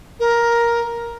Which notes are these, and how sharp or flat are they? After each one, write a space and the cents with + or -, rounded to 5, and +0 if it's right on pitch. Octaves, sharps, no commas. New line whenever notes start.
A#4 +10